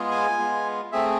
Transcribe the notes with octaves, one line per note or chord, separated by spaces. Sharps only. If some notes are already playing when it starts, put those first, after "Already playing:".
Already playing: G#3 B3 F4 G#4
G#5
G#3 B3 F4
A3 C4 G#4 E5